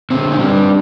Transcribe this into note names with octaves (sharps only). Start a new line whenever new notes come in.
D3 C4
D#4
G3 D4